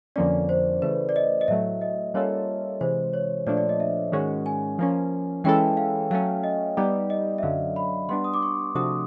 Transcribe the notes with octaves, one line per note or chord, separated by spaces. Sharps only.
F2 D3 F3 A#3 C#4 D5
C5
C#3 E3 A3 B4
D5
D#5
D#5
A2 F#3 A3 E5
D#5
G3 A#3 C#4 F4 A4 C#5
C3 E3 G#3 C5
C#5
A#2 F3 A3 D4 D5
D5
D#5
E5
G#2 D#3 G#3 C#4 F#4
G#5
F3 A#3 C#4
E3 G#3 C#4 E4 A4 G5
F5
F#3 A3 C#4 F5
D#5
G3 B3 D#4 G4 D5
D#5
E5
F#2 D3 F#3 F5
B5
G3 B3 D4 C6
D#6
D6
C#6
C3 F3 A3 D4 F#4 D#6